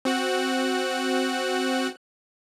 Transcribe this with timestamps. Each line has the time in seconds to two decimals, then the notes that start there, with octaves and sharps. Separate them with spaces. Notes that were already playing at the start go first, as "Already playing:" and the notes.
0.05 C4 F#4 F#6